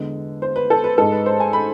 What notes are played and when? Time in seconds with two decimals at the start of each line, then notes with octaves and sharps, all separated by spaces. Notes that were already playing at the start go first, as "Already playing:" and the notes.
Already playing: E2 D3 G#3
0.42 C5
0.56 B4
0.70 A4
0.84 B4
0.98 G#2 G#3 A4
1.12 B4
1.26 C5
1.40 G#5
1.53 B5